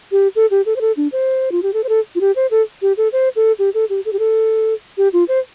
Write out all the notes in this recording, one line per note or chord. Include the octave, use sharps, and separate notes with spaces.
G4
A4
G4
A4
C5
A4
D4
C5
F4
G4
A4
C5
A4
F4
G4
C5
A4
G4
A4
C5
A4
G4
A4
G4
A4
G4
A4
G4
F4
C5